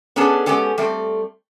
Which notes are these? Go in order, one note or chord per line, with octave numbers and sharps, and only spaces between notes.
B3 C#4 D4 G#4 A4 A5
G#3 B3 C#4 G4 A4
G3 A3 C4